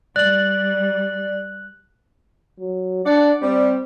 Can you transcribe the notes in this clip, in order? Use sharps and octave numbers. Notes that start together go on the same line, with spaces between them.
G3 D5 F#6 F#7
F#3
D4 D5 F#5
G3 C4